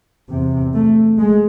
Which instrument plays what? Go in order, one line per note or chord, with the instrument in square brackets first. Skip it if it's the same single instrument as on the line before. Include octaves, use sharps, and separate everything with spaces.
[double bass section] E2 C3
A3
G#3